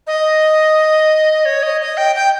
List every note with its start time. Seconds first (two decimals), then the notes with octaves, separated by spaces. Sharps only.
0.07 D#5
1.45 C#5
1.63 D#5
1.81 D#5
1.97 G5
2.15 G5